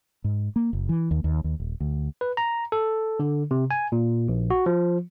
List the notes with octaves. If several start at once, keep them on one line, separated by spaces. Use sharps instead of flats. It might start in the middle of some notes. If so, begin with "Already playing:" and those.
G#2
A#3
F#1
E3
D#2
D#2
D#2
D#1
D2
B4
A#5
A4
D3
C3
G#5
A#2
A#1
F#4
F3